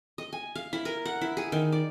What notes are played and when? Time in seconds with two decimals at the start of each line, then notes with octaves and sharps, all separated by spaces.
0.18 D#5
0.33 G#5
0.55 F5
0.73 E4
0.85 A#4
1.05 F#5
1.21 E4
1.37 G#4
1.52 D#3
1.72 D5